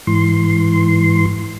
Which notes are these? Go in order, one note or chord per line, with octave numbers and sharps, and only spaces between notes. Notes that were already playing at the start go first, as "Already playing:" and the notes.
G#2 E3 C6